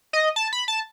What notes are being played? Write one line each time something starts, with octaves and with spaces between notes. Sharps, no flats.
D#5
A5
B5
A5